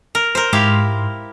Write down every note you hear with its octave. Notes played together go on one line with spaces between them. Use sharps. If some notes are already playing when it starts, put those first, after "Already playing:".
A#4
A#4 C5
G#2 E4 G4 F5 C6